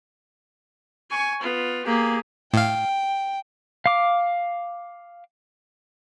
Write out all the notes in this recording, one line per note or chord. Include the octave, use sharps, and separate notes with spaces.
G#5 C#6
B3 F4
A#3 G4 G#4
A2 F5 G5
F5 D6